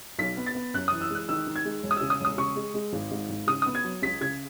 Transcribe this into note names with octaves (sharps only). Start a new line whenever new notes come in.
B1 B6
B3
A6
B3
F#2 F#6
D#6
E3
E6
G#3 F#6
D#3 E6
D#3
G#6
G#3
E1
D#6
E6
C#3
D#6
E1 D#6
C#3 C#6
G#3
G#3
G#1
G#2
G#1
C#3 D#6
D#6
B3
G#6
F#3
C#2 B6
C#3 G#6